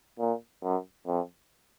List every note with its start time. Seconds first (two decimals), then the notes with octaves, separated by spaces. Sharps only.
0.19 A#2
0.63 F#2
1.07 F2